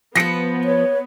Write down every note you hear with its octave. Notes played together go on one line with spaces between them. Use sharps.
F3 B3 F4 B4 A#6 C#7
C#5